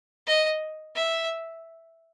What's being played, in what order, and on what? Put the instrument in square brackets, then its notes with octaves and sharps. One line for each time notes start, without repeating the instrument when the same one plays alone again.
[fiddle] D#5
E5